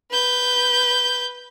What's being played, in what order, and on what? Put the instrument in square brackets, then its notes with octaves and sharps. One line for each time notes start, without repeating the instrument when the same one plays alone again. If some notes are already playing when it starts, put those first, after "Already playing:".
[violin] B4 G6